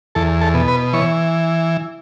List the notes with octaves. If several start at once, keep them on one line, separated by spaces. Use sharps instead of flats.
E2 A4
A4
B2
B4
E3 C#5